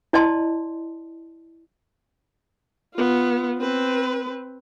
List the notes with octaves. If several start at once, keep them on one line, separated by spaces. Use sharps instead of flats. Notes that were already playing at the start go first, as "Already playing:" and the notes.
E4 D5 D#5 A5 C6
B3 F4
C4 B4